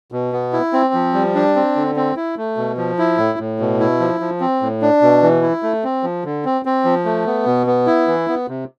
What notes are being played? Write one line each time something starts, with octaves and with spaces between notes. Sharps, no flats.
B2
B3
E4
C4
F3
G3
D4
C4
D3
C4
E4
A3
B2
F3
E4
A2
A2
B2
E4
F3
F3
C4
A2
D4
B2
E3
E4
A3
C4
F3
D3
C4
C4
F3
A3
B3
B2
B3
E4
E3
B3
C3